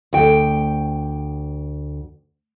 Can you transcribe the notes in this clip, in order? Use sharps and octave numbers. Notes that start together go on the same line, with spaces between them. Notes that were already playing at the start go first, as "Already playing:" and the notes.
D2 G5